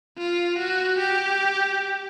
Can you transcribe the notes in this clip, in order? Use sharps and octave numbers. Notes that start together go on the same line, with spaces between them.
F4
F#4
G4